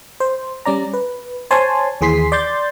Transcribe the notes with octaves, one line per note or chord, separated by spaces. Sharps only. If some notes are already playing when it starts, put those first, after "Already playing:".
C5
G3 C#4 D5 A#5
B4
C5 C#5 G#5 A5 C6
D#2 E3 G#4 C6 B6 C7
D5 C6 G6 A6